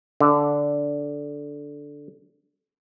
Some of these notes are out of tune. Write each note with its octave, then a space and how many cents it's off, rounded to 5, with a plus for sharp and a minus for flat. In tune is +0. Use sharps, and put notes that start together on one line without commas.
D3 -10